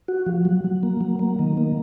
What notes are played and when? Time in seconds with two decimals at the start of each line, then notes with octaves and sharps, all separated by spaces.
0.08 F#4
0.26 F3
0.45 F#3
0.64 F#3
0.83 A#3
1.01 F#3
1.19 A#3
1.39 D#3
1.57 A#3